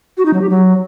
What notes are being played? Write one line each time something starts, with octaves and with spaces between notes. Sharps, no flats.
F#4
D#4
F#3
G4
F#3